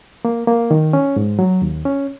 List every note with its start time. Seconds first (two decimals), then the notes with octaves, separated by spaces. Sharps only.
0.25 A#3
0.47 A#3
0.71 D#3
0.93 C#4
1.16 G#2
1.39 F#3
1.62 D#2
1.85 C#4